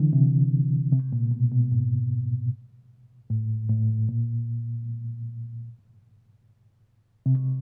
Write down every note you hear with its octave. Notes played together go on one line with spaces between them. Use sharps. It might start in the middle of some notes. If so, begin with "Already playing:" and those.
Already playing: D3 E3
C3
C3
A#2
B2
B2
G#2
A2
A2
A#2
C3